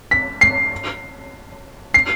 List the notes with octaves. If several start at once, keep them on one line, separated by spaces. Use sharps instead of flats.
B6
C7
C7